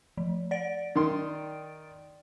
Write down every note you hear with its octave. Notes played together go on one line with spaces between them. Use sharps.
F3
D5 A6 D7
D#3 C6